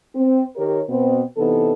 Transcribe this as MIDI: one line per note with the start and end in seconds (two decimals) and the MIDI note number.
0.15 0.42 60
0.55 0.79 51
0.55 0.79 67
0.55 0.79 70
0.55 0.79 73
0.89 1.22 47
0.89 1.22 59
0.89 1.22 60
1.37 1.73 48
1.37 1.73 52
1.37 1.73 59
1.37 1.73 63
1.37 1.73 69